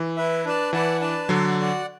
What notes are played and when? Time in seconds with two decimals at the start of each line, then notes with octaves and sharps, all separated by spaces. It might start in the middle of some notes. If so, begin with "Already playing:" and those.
Already playing: E3
0.17 E4 B4 E5
0.45 D4 B4 D5 A5
0.73 E3 E4 B4 D5 F#5 A5
1.01 D4 B4 D5 A5
1.29 D3 F#3 F#4 A4 D5
1.57 F#4 D5 F#5